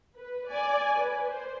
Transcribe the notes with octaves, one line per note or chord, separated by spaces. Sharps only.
B4
D5 G#5
B4
C5